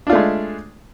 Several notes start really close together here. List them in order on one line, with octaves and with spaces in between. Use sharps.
D4 F4 A3 G#3